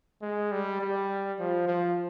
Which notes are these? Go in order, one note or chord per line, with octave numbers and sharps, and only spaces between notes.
G#3
G3
G3
F3
F3